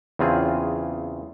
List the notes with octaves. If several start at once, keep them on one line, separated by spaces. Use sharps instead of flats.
E2 C#3 C4 F4 G#4